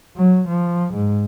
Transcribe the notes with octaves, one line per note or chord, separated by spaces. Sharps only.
F#3
F3
G#2